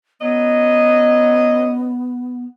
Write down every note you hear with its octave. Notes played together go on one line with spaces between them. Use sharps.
F#3 B3 C#4 D#5